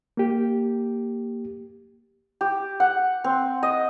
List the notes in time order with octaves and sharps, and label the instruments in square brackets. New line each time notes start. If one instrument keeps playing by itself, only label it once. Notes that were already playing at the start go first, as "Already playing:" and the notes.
[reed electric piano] A#3 G4
[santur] G4
F#5
C4
D#5